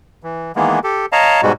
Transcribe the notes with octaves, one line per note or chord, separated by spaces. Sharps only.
E3
D#3 E3 G#3 A#3 B3
G4 A4
C#5 D#5 F5 A5 A#5
G#2 B2 G3 G#3 F#4